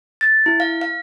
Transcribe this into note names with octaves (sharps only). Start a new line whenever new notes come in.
A6
E4
F5
F5